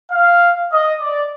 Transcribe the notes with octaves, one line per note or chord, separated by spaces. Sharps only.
F5
D#5
D5